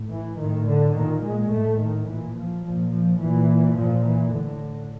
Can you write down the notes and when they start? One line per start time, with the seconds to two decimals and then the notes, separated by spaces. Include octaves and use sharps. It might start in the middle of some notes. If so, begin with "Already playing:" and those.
Already playing: A2
0.10 E3
0.38 A2 D#3
0.66 D3
0.93 A#2 D#3
1.22 G#3
1.50 A2 A3
1.79 D#3
2.06 A#2 E3
2.35 F3
2.63 A#2 F3
2.91 F3
3.19 A#2 E3
3.75 A#2 F3
4.04 E3
4.32 A2 D3